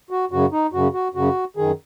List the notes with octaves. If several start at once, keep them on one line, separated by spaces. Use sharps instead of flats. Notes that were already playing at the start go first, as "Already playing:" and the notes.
F#4
F#2 C#3 F#4
D#4
F#2 C#3 F#4
F#4
F#2 C#3 F#4
F#2 D#3 G#4